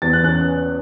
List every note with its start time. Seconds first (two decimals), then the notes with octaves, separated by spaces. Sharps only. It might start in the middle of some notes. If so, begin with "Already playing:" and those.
0.02 E2 A6
0.13 F#6
0.24 C#4 F#6